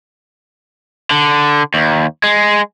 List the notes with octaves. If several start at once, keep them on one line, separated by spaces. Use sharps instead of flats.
D3
D#2
G#3